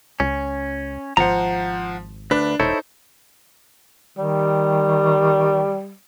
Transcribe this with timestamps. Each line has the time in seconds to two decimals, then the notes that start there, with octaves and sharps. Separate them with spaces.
0.20 C#2 C#4
1.17 G#1 F3 C5 F#5 A#5
2.31 D2 D4 B4
2.60 E1 D#4 E4 A4 C5 C#5
4.17 D#3 G3